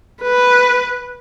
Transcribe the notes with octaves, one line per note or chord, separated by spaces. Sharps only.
B4